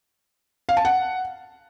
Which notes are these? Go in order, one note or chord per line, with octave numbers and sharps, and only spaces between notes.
F5
A5
F#5